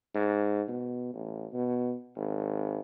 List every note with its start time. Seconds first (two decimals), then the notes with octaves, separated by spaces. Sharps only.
0.15 G#2
0.68 B2
1.13 A1
1.53 B2
2.16 G#1